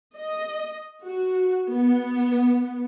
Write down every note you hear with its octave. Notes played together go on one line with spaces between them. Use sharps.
D#5
F#4
B3